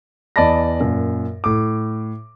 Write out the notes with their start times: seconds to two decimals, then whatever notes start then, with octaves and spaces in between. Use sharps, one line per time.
0.36 E2 D5 D#5 A5 B5 A#6
0.80 F#2 A#2
1.44 A2 D6